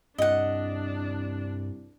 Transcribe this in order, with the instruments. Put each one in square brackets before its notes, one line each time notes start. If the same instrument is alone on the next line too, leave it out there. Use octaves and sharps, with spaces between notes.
[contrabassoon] C2 [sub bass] G2 [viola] D4 [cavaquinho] D#5 F#5